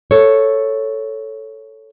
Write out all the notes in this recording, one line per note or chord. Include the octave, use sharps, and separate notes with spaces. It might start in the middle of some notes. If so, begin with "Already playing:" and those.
A4 C#5